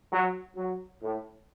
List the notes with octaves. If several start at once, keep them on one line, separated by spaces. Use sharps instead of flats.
F#3
F#3
A2